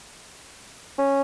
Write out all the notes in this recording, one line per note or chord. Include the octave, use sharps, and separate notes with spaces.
C#4